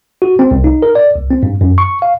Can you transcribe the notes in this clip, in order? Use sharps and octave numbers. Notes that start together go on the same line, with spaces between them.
F#4
C4
C2
D#4
A#4
D5
C2
C4
G2
F#2
C#6
F5